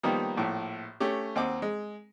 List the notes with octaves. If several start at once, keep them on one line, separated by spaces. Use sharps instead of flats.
D#3 F3 G3 A#3 B3 D#4
A#1 A2
A3 C#4 G4
D#2 C4 D#5 F#5 D6
G#3